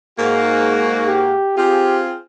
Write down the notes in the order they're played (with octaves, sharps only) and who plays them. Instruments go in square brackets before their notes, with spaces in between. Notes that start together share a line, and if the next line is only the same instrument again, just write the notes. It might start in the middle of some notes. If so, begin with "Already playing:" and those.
[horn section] G#2 A#3 F#4
[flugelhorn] G4
[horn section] C4 F4 G#4 [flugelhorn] G4